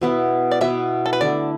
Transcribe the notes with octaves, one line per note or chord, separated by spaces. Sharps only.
B2 B3 E4
D5
B2 B3 E4 E5
A4
B4
D3 A3 E4 D5